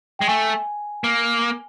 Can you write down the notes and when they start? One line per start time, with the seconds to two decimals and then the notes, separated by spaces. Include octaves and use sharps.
0.19 G#3 G5
0.28 A3 G#5
1.04 A#3